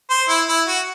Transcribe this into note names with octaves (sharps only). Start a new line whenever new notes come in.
C5
E4
E4
F#4